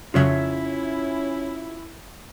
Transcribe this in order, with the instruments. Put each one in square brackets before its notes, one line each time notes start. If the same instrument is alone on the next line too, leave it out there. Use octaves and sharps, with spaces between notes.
[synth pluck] F2 C#3 F#3 [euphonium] C#4 [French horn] E4 [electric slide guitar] F4 C#5 E5